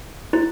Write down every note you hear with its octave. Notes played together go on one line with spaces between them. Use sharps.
E4